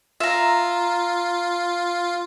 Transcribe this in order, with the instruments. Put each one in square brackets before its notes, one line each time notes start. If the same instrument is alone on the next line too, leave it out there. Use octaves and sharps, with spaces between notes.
[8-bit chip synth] F4 [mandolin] E5 A#5